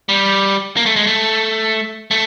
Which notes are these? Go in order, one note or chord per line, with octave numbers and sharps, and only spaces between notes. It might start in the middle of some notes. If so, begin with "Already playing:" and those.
G3
A#3
A3
G#3
A3
A3